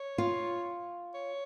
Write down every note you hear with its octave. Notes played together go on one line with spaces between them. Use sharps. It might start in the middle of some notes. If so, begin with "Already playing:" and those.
Already playing: C#5
F4
C#5